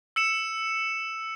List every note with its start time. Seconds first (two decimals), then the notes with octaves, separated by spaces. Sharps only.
0.16 E6 C#7 E7